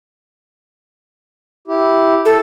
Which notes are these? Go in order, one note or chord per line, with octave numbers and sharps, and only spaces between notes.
E4 G4
A4